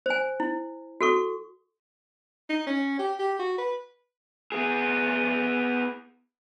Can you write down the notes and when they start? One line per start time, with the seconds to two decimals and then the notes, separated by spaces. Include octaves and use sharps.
0.06 C5 G#5
0.40 E4
1.01 F#4 A4 C#6
2.49 D#4
2.66 C#4
2.99 G4
3.19 G4
3.40 F#4
3.58 B4
4.52 B3 G#4